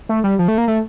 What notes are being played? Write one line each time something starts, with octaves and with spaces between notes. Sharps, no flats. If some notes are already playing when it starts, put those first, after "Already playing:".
A3
G3
F3
A3
A#3
A3